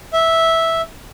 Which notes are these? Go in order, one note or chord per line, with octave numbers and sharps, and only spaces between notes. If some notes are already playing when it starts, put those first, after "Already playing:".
E5